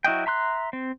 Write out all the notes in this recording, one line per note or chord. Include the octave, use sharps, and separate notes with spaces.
F#3 E4 F#4 D#5 G5
E5 A#5 C6 F#6
C4